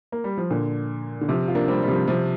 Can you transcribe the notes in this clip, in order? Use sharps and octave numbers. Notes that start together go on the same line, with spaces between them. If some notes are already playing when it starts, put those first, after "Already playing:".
A#3
G3
F3
A#2 D3
D3
C3 F3
F4
A#3 D4
G3 C4
G3
C3 F3
C3 F3